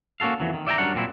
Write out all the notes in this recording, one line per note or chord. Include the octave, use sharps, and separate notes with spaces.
A#3 C#4 F#4 A4 F5
F2 E3 F#3
D#3
D5 E5 G5 G#5 A#5
F#2 G3 D4 A#4 C#5 F#5
F#2 A#2 C4 E4